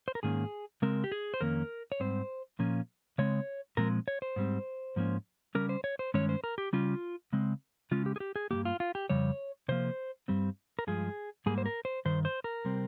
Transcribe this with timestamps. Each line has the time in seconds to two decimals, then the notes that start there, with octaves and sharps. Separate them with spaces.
0.08 C5
0.15 A#4
0.23 G#2 D#3 A#3 C#4 G#4
0.82 C#3 G#3 C4 A#4
1.04 G4
1.12 G#4
1.34 C5
1.41 F2 D#3 A#3 C#4 A#4
1.92 C#5
2.00 G#2 G3 C4 C5
2.59 A#2 F3 A#3 C#4
3.18 C#3 G#3 C4 C#5
3.77 A#2 F3 G#3 C4 A#4
4.08 C#5
4.22 C5
4.36 G#2 G3 C4
4.96 G#2 F3 A#3 C#4
5.55 C#3 G3 C#4 A#4
5.69 C5
5.84 C#5
5.99 C5
6.14 G2 D#3 G#3 C#4 C#5
6.29 C5
6.44 A#4
6.58 G4
6.73 C#3 G3 C#4 F4
7.33 C#3 G#3 C4
7.91 C#3 G#3 C#4 F4
8.06 G4
8.16 G#4
8.20 G4
8.36 G#4
8.51 G2 D#3 A#3 G4
8.65 F4
8.80 F4
8.95 G4
9.10 F2 C#3 G3 C#5
9.68 C3 F3 A#3 C5
10.28 G2 G3 C4
10.79 A#4
10.87 G2 F3 G#3 G#4
11.46 G#2 G3 A#3 G#4
11.58 C5
11.66 A#4
11.85 C5
12.05 G2 D#3 C5
12.25 C5
12.44 A#4
12.65 C3 G3 C4